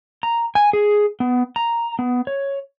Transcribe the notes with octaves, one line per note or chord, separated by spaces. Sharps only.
A#5
G#5
G#4
B3
A#5
B3
C#5